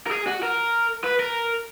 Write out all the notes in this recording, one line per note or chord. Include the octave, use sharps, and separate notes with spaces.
A#4
G#4
F#4
A#4
B4
A#4